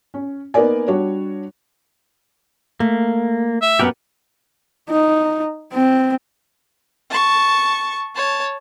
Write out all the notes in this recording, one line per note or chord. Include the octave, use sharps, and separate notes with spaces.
C#4
A#3 B3 D#4 A#4 D5 G#5
G3 D4 F#4 C#5
A3 A#3
E5
F#2 B3 G4 A#4 B4 F#5
D#4
C4
A5 C#6
C#5 A5